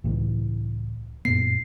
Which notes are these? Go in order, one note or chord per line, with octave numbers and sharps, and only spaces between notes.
C#2 A2 E3
F#2 A#2 B3 C7